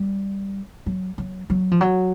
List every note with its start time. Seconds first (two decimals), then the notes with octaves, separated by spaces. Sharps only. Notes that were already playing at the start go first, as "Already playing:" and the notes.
Already playing: G3
0.86 F#3
1.18 F#3
1.50 F#3
1.71 F3
1.81 F#3